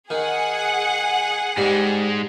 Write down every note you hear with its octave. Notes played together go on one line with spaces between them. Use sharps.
D#3 G#4 F#5
G#2 G3 G#3